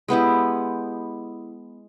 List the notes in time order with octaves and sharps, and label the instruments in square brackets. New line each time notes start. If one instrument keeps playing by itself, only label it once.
[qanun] G#3 B3 E4 G4